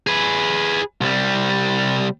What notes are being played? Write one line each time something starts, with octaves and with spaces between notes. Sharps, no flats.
G#4 B4
C2 G3